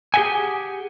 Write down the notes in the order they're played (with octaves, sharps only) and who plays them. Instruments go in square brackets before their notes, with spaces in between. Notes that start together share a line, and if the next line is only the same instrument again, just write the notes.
[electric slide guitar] G4 G#4 C5 E5 F#5 G#5